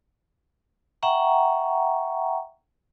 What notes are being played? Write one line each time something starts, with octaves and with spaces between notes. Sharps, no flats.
E5 F#5 G5 A#5 C#6